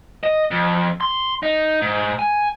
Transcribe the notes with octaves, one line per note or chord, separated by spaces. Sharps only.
D#5
F2
C6
D#4
G#2
G#5